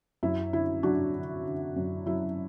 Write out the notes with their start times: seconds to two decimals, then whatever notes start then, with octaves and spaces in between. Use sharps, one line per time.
0.23 F#2 E4
0.53 D3 E4
0.83 F#3 D4 F#4
1.15 D3
1.45 D3
1.76 F#2
2.06 F#3 E4